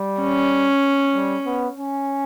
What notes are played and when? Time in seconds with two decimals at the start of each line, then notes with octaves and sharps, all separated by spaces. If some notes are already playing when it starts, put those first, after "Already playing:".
Already playing: G3
0.21 C#4
1.14 G3
1.46 B3
1.77 C#4